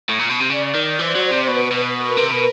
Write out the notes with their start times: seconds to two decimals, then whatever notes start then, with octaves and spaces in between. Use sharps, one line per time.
0.09 A2
0.19 A#2
0.30 B2
0.40 C3
0.50 C#3 D5
0.75 D#3
0.99 E3 C5
1.15 F#3
1.31 C3
1.48 B2 B4
1.71 B2
1.96 A#4
2.17 C3
2.32 B2